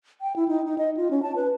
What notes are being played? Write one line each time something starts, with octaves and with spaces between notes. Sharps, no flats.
G5
E4
D#4
D#4
D#5
F4
C#4
A5
B4